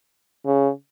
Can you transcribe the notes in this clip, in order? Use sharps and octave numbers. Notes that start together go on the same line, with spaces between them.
C#3